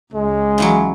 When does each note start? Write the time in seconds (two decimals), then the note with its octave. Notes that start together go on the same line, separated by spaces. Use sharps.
0.14 C#2 G#3
0.58 C#3 E3 F#3